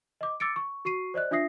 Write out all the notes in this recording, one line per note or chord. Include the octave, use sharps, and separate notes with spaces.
D#5 D6
D6 E6 A6 C#7 D7
C#6
F#4 C#6 C7 D#7
C5 D5 D#5 F#6
D4 F4 E5 D#6 A#6 C7